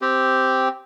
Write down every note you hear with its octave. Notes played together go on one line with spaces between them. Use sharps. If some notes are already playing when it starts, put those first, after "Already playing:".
C4 G4